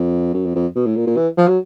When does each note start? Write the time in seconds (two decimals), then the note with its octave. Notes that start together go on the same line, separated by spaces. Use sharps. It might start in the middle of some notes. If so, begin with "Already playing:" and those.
Already playing: F2
0.34 F#2
0.45 F2
0.55 F2
0.76 B2
0.86 A2
0.96 A#2
1.07 A#2
1.17 E3
1.37 F3
1.48 F#3